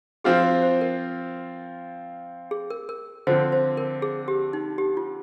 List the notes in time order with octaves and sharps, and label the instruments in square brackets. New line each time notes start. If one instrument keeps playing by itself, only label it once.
[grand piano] F3 C4 F4 [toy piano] G#4
[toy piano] C5
C5
A#4
G#4
A#4
A#4
[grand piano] D3 F3 C4 [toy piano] C5
[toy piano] C5
A#4
G#4
G4
D#4
G4
F4